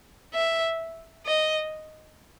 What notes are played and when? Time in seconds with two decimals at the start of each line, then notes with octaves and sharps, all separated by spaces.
0.34 E5
1.26 D#5